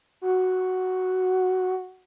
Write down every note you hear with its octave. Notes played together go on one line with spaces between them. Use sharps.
F#4